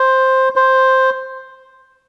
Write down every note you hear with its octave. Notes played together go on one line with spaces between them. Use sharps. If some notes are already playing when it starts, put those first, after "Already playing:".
Already playing: C5
C5